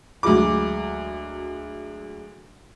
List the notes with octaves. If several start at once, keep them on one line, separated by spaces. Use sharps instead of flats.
D2 F#3 G#3 D6